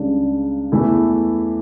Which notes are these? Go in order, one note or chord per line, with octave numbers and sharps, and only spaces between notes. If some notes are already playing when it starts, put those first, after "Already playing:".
Already playing: C#2 C#3 G3 D4
E2 E3 A3 E4